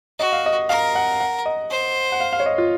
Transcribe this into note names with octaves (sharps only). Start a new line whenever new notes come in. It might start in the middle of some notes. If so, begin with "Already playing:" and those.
F#4 D#5
F5
D#5
A#4 F5
F#5
F#5
D#5
C5
F#5
F5
F5
C#5
D#5
F4